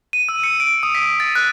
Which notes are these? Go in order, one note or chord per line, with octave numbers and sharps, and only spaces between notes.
D#7
E6
C#7
D7
D#6
B6
A6
F#6